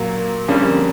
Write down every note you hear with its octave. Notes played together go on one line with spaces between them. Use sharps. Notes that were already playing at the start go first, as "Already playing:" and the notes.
Already playing: A#2 F#3 A#3
F2 D3 G3 A#3 C#4